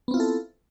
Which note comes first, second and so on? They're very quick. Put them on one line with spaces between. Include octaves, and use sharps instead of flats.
B3 C4 F4 E4 A4